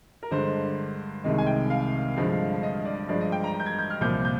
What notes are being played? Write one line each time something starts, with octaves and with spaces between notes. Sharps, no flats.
A#4
G2 D3 G#3 C5
C2 C3 D#3 G#3 D#5
G#5
G5
F5
G2 D3 F3 G#3
D#5
D5
G2 F3 G#3 D5
D#5
G5
A#5
G6
G#6
G6
F6
C2 A#2 F3 G6
G6